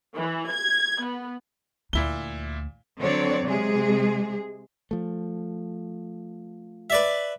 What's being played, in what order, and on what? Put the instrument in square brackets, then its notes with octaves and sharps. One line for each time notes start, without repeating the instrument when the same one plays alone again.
[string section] E3
G#6
B3
[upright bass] D2 [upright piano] A#2 E4 G7
[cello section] D3 F#3 C4 C#5 D5
C3 G#3 G#4
[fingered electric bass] F3 A3
[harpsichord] B4 D5 E5